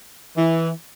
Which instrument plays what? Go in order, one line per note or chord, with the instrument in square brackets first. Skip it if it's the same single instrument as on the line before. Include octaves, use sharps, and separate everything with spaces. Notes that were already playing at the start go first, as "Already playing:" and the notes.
[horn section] E3